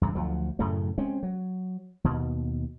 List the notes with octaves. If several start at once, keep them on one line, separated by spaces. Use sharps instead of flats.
E2 G2 C#3
D2 F3 F#3
F#2 A2 C#3 A3
G#3 C4 C#4
F#3
D#2 B2